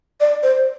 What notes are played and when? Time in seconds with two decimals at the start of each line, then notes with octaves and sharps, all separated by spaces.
0.21 D5
0.43 C5